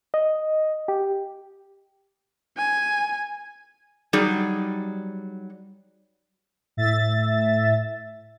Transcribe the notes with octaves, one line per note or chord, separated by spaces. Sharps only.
D#5
G4
G#5
F#3 G3 D#4 G#4 D5
A2 E5 A6